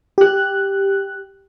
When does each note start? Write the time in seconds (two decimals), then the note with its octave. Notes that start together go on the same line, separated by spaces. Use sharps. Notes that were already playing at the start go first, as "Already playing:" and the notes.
0.18 G4 F#6